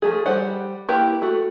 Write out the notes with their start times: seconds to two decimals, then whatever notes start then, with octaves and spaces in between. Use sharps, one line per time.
0.02 F3 A3 G#4
0.26 G3 C5 F#5
0.89 A#3 E4 G4 A#4 B4
1.22 A3 F#4